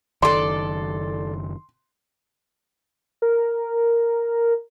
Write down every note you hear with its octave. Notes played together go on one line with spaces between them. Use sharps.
F#1 D#3 A4 D5 C6
A#4